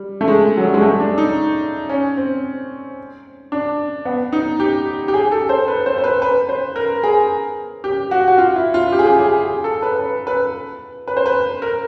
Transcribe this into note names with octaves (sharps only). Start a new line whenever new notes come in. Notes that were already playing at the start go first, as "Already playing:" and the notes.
Already playing: G3
A3
G#3
F#3
G3
G#3
A3
D4
D#4
C#4
C4
D4
B3
D#4
G4
G4
G#4
A4
C5
B4
C5
C5
B4
B4
C5
A#4
G#4
G4
F#4
F#4
F4
E4
F4
G4
G#4
G4
G#4
G#4
A4
B4
B4
B4
B4
C5
B4
A#4